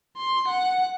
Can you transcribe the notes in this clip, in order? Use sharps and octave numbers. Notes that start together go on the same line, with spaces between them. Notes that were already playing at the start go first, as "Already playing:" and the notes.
C6
F#5